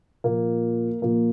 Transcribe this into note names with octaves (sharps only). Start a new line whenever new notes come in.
A#2 F3 A#3
A#2 F3 A#3